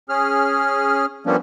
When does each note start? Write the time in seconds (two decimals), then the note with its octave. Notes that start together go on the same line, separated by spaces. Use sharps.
0.09 C#4 G#4 F6
1.26 F3 G3 A#3 B3 C#4 D4